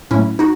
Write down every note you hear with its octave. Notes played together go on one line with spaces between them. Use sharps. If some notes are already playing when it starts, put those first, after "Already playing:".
A2 F#3 A3 C#4 E4
D#4 F#4